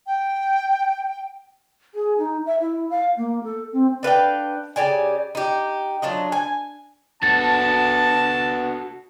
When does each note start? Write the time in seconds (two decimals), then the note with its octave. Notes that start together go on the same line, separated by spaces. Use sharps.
0.07 G5
1.95 G#4
2.18 D#4
2.46 E5
2.60 E4
2.90 F5
3.17 A#3
3.44 A4
3.73 C4
4.03 D4 B4 F5 G5
4.76 C#3 G4 D5 G#5
5.35 D#4 G4
6.02 F#3 D4 F4 D#5
6.32 G#5
7.23 B3 D4 F#4 A4 A5 A6